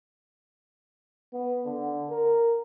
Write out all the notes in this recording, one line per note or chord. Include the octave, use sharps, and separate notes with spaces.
B3
D3
A#4